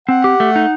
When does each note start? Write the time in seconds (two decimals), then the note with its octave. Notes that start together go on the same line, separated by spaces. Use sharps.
0.08 C4 F#5
0.24 G4
0.40 A3
0.56 D#4